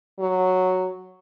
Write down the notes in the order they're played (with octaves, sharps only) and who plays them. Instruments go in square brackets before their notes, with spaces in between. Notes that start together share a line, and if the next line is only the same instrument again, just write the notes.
[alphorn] F#3